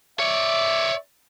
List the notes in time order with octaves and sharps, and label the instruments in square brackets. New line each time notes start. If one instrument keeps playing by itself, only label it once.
[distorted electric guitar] C#5 D5 [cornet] E5